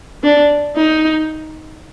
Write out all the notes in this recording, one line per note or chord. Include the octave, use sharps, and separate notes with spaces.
D4
D#4